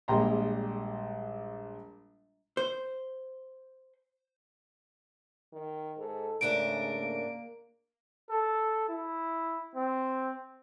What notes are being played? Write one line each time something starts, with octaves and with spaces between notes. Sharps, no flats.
A#1 G3 G#3 G5 A#5 C6
C5
D#3
G#2 A4
G#2 C#3 G#3 A3 D4 A#4 D7
A#3
A4
E4
C4